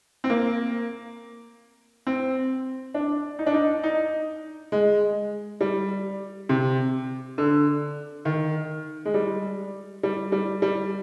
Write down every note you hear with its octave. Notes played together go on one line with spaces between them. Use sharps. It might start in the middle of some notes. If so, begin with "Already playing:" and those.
C4
A#3
C4
D4
D#4
D4
D#4
D#4
G#3
G3
C3
D3
D#3
G#3
G3
G3
G3
G3